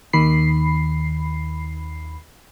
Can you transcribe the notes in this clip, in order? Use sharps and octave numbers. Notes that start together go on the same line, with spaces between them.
D#2 D#3 B5 C7